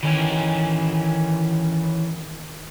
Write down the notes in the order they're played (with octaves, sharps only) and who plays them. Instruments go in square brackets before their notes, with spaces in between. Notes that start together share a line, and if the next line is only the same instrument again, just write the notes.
[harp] D#3 [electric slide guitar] E3 C#4